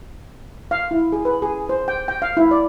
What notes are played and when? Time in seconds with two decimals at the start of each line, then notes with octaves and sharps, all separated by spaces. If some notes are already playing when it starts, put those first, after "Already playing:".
0.71 F5
0.91 E4
1.13 G#4
1.25 B4
1.42 G#4
1.69 C5
1.88 G5
2.08 G5
2.22 F5
2.37 E4
2.51 D5